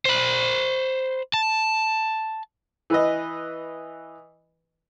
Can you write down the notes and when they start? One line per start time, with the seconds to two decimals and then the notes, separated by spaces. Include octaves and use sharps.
0.05 C5 B5
1.34 A5
2.90 E3 B4 D#5